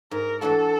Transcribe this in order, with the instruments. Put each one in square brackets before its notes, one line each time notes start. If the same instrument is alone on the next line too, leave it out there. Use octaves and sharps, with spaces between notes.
[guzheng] G#2 [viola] A#4
[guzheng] E3 A3 D4 F#4 [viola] A4